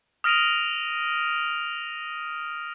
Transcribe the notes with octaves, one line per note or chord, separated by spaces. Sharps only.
D#6 F6 A#6 D7 D#7 F7